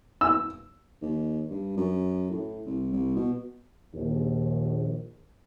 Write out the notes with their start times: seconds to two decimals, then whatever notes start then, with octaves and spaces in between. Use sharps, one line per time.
0.21 E6
1.02 D#2
1.50 G2
1.77 F#2
2.31 A2
2.66 C2
2.93 C2
3.16 B2
3.94 A#1 D#2